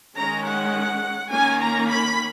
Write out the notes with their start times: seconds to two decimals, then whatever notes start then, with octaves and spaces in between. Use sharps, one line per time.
0.17 D#3 G#3 C#4 A#5
0.46 F#5
1.31 D#3 A#3 C#4 G#5
1.61 A#5
1.89 B5